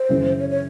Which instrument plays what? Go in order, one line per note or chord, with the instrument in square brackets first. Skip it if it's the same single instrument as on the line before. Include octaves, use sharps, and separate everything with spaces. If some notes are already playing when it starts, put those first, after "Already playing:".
Already playing: [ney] C5
[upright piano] F#2 C#3 E3
[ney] C#5
C#5